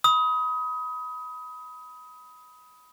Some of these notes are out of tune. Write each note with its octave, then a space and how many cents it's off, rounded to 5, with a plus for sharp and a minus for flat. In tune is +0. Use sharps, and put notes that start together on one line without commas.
B5 +0 D#6 +25